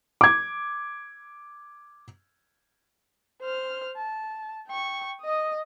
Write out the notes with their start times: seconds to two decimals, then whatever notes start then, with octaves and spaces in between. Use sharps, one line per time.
0.21 D6 G#6
3.41 C5 F6
3.97 A5
4.67 G5 C#6
5.21 D#5 D#6